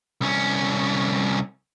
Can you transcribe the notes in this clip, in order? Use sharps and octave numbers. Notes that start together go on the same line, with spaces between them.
C2 C#4